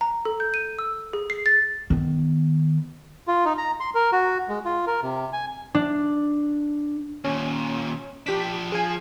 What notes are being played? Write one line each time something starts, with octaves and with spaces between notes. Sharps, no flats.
A#5
A4
G6
D#7
E6
G#4
C7
A6
D#3 B3
F4
D#4
A#5
C6
A#4
F#4
G#3
F4
A#4
C3
G#5
D4
D#2 A#2 C#4
F3 D4 G4 B6
F3 G#4 G#5